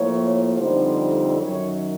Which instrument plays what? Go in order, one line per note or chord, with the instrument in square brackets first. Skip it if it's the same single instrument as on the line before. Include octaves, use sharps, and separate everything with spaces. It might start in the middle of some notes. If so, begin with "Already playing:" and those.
Already playing: [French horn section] A2 F3 A#3 C#5
F2 D3 G3 C4 D#4 C5
F#2 D#3 F#3 C#5